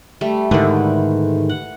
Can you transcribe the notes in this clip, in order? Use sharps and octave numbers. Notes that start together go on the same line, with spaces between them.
G3 A3
G#2 D3 D#3 E4 B4
F#5